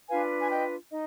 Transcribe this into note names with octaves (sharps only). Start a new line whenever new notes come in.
D4 F4 B4 F5 G#5
G#5
D#5 G5
D#4 D#5